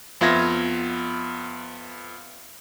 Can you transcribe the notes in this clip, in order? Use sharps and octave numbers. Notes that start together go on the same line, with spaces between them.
F2 B3 F4 E5 G#6 A#6